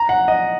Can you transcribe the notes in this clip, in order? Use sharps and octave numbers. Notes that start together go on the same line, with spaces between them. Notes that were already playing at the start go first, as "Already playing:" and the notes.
Already playing: A#5
F#5
D#5